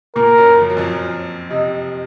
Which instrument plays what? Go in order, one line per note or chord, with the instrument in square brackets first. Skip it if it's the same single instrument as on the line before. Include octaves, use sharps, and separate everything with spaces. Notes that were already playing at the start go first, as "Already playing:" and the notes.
[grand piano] A#2 A#3 [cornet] A#4
[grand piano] F#2 F#3
F3
F#3
F2 F3
[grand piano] C3 [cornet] D#5